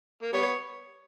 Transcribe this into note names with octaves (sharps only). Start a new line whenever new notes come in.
A#3
G3 B3 C#5